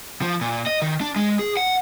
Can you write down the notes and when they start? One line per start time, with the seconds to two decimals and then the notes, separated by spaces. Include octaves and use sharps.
0.22 F3
0.41 A#2
0.67 D#5
0.82 D#3
1.01 D4
1.16 G#3
1.39 G#4
1.57 F#5